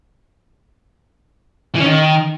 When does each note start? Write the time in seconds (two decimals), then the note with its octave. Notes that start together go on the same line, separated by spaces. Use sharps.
1.75 E3
1.80 C#4
1.86 D#3